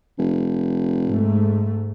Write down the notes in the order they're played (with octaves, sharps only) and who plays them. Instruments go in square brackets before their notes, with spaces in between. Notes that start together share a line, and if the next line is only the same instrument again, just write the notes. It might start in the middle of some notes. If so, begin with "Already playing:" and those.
[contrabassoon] F1
[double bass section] G#2 A3